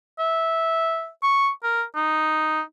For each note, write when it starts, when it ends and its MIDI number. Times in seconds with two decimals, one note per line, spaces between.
0.19 1.08 76
1.23 1.49 85
1.63 1.83 70
1.96 2.61 63